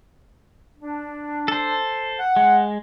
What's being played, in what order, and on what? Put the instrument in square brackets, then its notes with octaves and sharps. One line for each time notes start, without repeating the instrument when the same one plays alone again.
[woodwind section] D4
[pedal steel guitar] A4 C5
[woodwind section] F#5
[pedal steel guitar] G#3